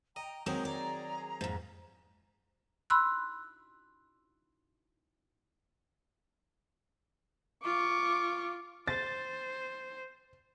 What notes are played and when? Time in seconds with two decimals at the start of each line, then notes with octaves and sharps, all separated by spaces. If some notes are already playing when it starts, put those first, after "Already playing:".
0.16 D#5 G5 A#5
0.46 D#3 F#3 G#3 C4 A#5 D#6 G6
0.65 G#4 D5 A#5
1.41 F2 G#2
2.90 B5 C6 E6 F#6
7.64 F4 C#6 D6
8.88 C5 A6